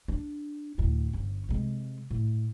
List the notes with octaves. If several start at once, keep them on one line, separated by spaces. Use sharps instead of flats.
D4
D2 A2
G1 C#4
C3 G#3
A2